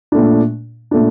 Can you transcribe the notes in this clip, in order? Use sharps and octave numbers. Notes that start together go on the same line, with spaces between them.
A#2 A3 D4
A#2 A3 D4